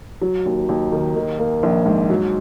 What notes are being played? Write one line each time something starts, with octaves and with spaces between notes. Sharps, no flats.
F#3
D#2
D#2
D#3
D#3
A#3
A#1
G#2
F#3